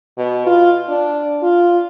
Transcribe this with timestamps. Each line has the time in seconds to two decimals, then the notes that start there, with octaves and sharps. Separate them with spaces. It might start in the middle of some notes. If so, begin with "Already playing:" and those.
0.17 B2
0.46 F4
0.89 D4
1.42 F4